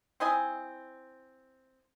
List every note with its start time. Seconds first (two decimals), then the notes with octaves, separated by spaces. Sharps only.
0.20 C4 E4 D#5 G#5